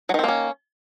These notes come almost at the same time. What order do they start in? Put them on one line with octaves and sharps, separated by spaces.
F#3 D#3 C4 A#3 C#4